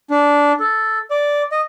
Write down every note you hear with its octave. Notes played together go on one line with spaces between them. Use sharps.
D4
A4
D5
D#5